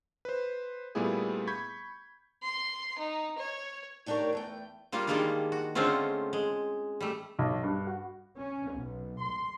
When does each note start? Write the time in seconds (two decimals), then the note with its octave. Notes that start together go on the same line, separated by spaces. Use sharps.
0.25 B4 C5
0.95 A#2 G3 A3 B3 E4 G#4
1.47 B5 C#6 G6 G#6 B6
2.43 C6
2.98 D#4
3.39 C#5
4.06 D#3 A3 D4 G4 A#4 C#5
4.33 E2 A3 G5
4.92 G3 A#3 F4
5.07 D#3 G3 G#3 A#3 D4 F4
5.52 F#4
5.75 D3 G#3 A3 C4 C#4 F4
6.33 G#3
7.01 G3 A3
7.39 B1
7.63 G2
7.87 F#4
8.39 C#4
8.75 B1
9.21 C6